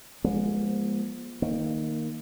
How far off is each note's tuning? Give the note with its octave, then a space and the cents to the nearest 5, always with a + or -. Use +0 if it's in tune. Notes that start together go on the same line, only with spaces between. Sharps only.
F3 +0 G#3 +0 B3 -45
D#3 +0 A#3 -5